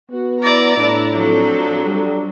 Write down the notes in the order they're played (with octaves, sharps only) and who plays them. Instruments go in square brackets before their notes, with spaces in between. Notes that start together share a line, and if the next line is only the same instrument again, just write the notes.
[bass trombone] B3 [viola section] F#4
[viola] E4 D5 [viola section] A#5 [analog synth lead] A#6
[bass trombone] A2 [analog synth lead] D4 [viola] E4
[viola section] F3 C4 A4 [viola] F#3
[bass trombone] G3